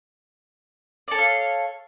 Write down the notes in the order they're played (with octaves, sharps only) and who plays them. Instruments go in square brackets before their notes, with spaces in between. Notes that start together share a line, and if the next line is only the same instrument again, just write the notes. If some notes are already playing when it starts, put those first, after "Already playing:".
[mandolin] D5
A4
C#5
F5